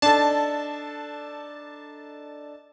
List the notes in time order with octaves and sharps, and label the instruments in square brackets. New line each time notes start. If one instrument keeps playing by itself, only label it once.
[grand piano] D4 D#4 A4 [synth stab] A5